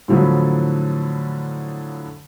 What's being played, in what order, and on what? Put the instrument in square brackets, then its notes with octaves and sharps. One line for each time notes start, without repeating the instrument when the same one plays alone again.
[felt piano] A2 D3 F3 F#3 E4